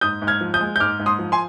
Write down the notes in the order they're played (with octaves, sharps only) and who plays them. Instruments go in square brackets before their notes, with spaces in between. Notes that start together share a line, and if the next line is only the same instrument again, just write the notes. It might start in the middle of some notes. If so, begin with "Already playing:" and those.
[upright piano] G#2 D#6 G6
G#2
F6 G#6
F3
D#6 G6
G#3
G6
G#2 D6 F6
G#2
C6 D#6
F3
G#5 C6